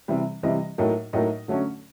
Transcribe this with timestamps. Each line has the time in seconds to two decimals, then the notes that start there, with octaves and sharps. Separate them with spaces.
0.08 C3 E3 G3
0.43 C3 E3 G3 D#5
0.78 A2 F#3 A#3 D#4
1.13 A2 F#3 A#3 D#4 D#5
1.48 D3 F#3 A3 C#4